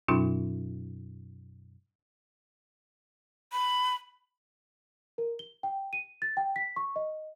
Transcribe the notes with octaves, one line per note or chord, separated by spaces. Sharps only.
F#2 B2 F#3 C#4 D#4 F4
B5
A#4
G7
G5
D#7
A6
G5
B6
C#6
D#5